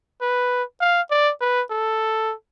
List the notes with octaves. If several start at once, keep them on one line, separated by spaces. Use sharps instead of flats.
B4
F5
D5
B4
A4